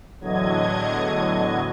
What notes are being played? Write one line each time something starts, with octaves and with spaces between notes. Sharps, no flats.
E2 A2 D3 F#3 D#5 G#6